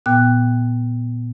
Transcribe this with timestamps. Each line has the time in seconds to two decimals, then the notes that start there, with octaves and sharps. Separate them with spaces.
0.06 A#2 B3 G5 F#6